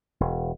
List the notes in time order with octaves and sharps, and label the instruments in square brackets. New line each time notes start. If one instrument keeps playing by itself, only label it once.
[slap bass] E1